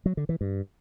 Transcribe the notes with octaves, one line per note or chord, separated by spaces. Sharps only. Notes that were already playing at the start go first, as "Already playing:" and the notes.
F#3
D3
E3
G2